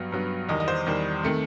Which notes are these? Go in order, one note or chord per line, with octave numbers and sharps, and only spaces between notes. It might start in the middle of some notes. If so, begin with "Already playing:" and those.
Already playing: G2 F#3 B3
G2 F#3 B3
E2 D#3 G3 D#5
D#5
C5
E2 D#3 G3
D#3 A3 C4